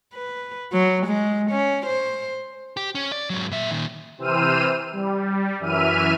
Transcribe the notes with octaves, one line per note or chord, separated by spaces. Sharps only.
B4
F#3
G#3
C#4
C5
G4
C#4
D5
G#2 F#3
A#2 E5
A#2 D#3
C3 E3 C5 E6 F6 D#7
G3
F#2 E3 E5 F6 D#7